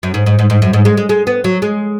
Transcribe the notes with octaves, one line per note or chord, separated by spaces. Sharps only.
F#2
G#2
G#2
G#2
G#2
F#2
G#2
G#3
G#3
G#3
B3
F#3
G#3